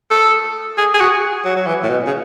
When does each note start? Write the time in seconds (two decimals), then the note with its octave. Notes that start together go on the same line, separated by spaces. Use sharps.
0.11 A4
0.78 G#4
0.94 G#4
1.00 F#4
1.45 F#3
1.56 F#3
1.67 E3
1.83 A2
1.89 B2
2.06 C#3